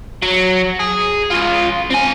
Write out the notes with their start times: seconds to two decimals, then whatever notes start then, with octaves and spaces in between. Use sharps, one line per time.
0.22 F#3
0.80 G#4
1.31 C#2 F4
1.90 C4 G#5